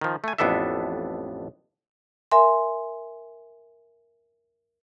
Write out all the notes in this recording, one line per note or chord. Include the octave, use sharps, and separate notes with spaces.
D#3 F3
A3 G#5
A1 F2 B3 D4 A4 E5
A#4 E5 G#5 C6